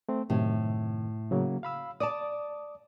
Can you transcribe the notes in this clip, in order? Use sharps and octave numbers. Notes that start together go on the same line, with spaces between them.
A3 C4
F#2 A2 C3 D#3
C#3 F#3 A#3
F5 B5 E6
D5 A5 D6 D#6